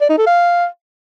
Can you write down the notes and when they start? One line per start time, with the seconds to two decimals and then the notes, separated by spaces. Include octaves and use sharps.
0.01 D5
0.09 D#4
0.18 A4
0.26 F5